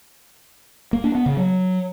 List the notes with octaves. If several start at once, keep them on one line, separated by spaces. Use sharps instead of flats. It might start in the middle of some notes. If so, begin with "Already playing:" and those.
A#3
D4
B3
C#3
F#3